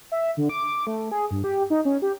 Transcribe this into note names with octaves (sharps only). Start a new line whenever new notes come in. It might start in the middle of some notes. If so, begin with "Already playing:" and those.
E5
D3
D6
A3
G#4
G2
G4
D#4
C#4
G4